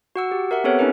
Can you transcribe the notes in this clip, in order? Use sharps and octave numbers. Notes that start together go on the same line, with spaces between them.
F#4 F#5 E6
G4
A#4 E5 F#5
B3 C4 G4 A4 B4 C#5
C4 C#4 D#4 A#4 B4